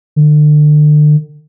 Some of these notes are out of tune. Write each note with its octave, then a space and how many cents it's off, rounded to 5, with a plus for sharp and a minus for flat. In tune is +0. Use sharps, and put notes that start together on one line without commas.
D3 +35